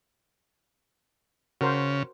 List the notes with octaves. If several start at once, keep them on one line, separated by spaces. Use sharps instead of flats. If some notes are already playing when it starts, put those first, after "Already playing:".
C#3 F#4 A#4 C5